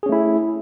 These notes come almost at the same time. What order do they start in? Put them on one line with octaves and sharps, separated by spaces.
G#4 C#4 A3 E4